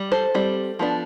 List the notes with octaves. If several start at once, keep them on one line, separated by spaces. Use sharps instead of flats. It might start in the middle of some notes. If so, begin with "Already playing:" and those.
Already playing: G3
A4 C5
G3 C4
F3 B3 D4